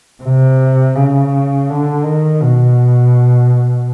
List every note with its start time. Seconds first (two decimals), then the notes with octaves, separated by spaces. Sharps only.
0.23 C3
0.95 C#3
1.69 D3
2.05 D#3
2.42 B2